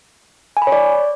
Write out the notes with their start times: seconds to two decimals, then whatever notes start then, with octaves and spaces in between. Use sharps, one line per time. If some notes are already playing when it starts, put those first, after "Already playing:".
0.57 G#5
0.62 B5
0.67 C#5
0.72 D5